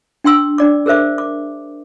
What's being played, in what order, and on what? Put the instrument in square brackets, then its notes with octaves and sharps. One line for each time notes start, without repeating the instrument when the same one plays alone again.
[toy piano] D4 G5 C6 E6
D4 D5 D6
G#4 A#4 C5 E5 D6
D6